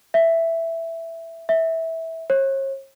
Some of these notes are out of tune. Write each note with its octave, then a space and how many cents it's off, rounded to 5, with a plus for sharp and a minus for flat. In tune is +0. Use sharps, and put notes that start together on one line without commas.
E5 +5
E5 -15
C#5 -40